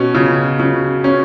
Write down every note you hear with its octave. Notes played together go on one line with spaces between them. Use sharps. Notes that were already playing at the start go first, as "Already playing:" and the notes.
Already playing: B2 C#4
C#3
C#3
C#4